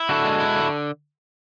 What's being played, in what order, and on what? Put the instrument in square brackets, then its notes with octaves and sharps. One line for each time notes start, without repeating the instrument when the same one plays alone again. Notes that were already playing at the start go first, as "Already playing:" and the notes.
Already playing: [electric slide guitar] E4
[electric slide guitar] D3 [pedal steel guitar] F#4 A4
[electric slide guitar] G#3
E4
D3